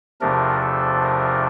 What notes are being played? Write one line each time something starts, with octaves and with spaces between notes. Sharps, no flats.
E2 C3 F3 A3 D4 A#4
A4
A#4